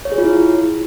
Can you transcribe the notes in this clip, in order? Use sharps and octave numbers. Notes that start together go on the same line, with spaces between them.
C#5
G#4
F4
E4